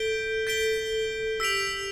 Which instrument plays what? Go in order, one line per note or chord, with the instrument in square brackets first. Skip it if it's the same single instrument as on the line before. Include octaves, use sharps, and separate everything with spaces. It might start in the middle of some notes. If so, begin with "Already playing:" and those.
Already playing: [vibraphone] A4 [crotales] G6 B6 D7 G7
[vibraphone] A4 [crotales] G6 B6 D7 G7
[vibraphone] G4 [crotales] E6 B6 D7 F7